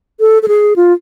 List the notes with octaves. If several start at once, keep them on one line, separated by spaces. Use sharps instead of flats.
A4
A4
G#4
F4